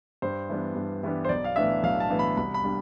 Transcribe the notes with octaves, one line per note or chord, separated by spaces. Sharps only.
G2 C5
E3 G3 B3 D4
G2
E3 G3 B3 D4
C5
B1 D5
F5
A2 E3 B3 D4 E5
B1 F5
A5
A2 E3 B3 D4
B5
C2 B5
B5
G3 D4